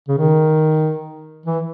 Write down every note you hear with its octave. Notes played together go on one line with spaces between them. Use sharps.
C#3
D#3
E3